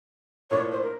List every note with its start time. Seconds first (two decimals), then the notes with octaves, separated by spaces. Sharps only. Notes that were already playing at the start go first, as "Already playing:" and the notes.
0.50 A2 F3 A#3 D4 C#5
0.72 C5
0.83 A#4